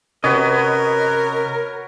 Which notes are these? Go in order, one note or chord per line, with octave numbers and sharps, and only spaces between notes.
C3 C#4 F#4 A#4 B4 C#5 D#5